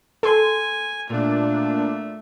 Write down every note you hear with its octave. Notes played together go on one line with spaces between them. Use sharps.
A4 G#5 C6
A#2 A3 D4